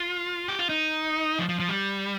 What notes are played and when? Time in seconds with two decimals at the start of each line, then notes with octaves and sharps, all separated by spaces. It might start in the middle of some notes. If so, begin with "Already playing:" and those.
Already playing: F4
0.48 G4
0.59 F4
0.69 D#4
1.39 F3
1.49 F3
1.60 F3
1.69 G3